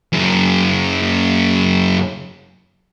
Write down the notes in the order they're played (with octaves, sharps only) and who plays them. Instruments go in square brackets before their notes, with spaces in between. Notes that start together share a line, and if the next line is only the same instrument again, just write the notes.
[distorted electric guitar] F#2 C#3